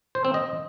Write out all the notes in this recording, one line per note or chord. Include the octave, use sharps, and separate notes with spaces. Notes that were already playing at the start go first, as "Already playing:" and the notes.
C5
C4
D#5